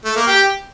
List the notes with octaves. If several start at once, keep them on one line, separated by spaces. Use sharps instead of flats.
A3
A#3
G4